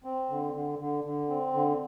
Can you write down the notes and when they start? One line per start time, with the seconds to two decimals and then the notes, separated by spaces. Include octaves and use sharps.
0.04 C4
0.30 D3
0.54 D3
0.79 D3
1.04 D3
1.29 C4
1.53 D3